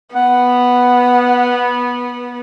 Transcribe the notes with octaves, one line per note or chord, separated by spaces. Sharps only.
B3 F#5